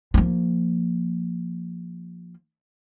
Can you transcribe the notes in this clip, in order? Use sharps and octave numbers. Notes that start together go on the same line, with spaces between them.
F3 A#3